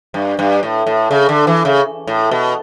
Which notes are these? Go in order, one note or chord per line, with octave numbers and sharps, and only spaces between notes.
G2
G2
A2
A2
C#3
D3
E3
C#3
A2
B2